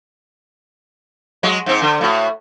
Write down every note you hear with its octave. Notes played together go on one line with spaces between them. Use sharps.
F#3 G#3 F#4
G#2 C4
D3
A2 F#4